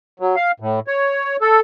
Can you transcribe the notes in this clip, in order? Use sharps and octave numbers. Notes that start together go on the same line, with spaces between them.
F#3
F5
A2
C#5
A4